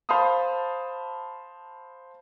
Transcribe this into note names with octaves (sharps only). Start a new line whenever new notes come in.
C5 F5 A5 B5 D#6